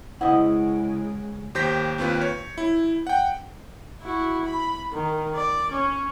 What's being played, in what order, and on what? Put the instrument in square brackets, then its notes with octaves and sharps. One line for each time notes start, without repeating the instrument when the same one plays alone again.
[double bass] C#3 G#3 [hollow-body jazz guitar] E4 C5 D#5 [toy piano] F#5 D#6
[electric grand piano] D#2 G4 C5 G6 A#6 B6
D#2 C4 F4 B4
C#5
E4
F#5 G5
[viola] E4 F#4
B5
D#3
D5
C#4